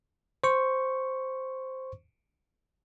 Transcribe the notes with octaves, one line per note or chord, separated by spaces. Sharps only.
C5 C#6